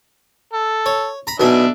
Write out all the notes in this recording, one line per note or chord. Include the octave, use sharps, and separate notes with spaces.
A4
C#5
A#5 B5
B1 B2 D4 E5 G#5